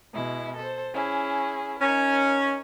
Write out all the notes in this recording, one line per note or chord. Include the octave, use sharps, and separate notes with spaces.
B2 G#3 E4
A4 C5
C#4 E4 G#4
C#4 D#4 A#4